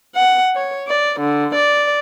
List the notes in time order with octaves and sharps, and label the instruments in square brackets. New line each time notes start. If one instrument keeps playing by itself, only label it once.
[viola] F#5
C#5
D5
D3
D5